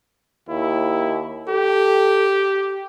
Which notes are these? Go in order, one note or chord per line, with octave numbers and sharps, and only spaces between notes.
D#2 E4
G4 A4